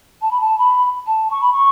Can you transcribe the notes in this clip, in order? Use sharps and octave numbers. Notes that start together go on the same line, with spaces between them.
A5
B5
A5
B5
A5
C#6
B5
C#6